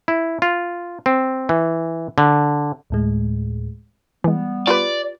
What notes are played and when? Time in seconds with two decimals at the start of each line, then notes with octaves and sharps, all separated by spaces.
0.08 E4
0.42 F4
1.06 C4
1.49 E3
2.18 D3
2.90 D2 A2 G#3
4.24 E3 G3 G#3 B3
4.67 F4 G4 B4 D5